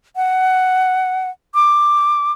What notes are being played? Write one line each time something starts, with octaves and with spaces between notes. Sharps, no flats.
F#5
D6